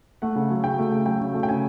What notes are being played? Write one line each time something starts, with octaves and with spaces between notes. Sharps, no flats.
A3 F#5
C#3
F#3
C#3 G5
A3
C#3
F#3 G5
C#3
A3
G5
C#3 G#5